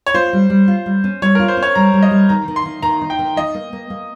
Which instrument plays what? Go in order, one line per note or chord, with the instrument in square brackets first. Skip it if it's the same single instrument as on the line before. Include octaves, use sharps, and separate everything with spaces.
[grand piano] C#5
[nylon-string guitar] F4 [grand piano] C5
[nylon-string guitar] G3
G3
F4
G3
C#4
[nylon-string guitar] G3 [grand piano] C#5
[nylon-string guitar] F4 [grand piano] A#4
[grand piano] C5
[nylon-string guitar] C#4
[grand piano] C#5
[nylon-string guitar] G3 [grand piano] A#5
[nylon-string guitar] G3
[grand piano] D#5
[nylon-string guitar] G3
[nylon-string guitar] D#3 [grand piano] A#5
[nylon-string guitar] D#3
[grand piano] C6
[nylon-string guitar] D#3
[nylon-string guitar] D#3 [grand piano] A#5
[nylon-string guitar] D#4
[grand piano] G5
[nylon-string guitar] D#3
[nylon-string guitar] D#4 [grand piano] D#5
[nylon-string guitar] A#3
A#3
A#3